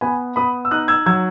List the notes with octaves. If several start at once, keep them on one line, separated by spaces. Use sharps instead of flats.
B3 G#5 B5
B3 B5 D#6
E6
D#4 D#6 F#6
E6 G#6
F#3 E6 G#6